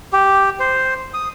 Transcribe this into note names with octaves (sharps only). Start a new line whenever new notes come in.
G4
C5
D#6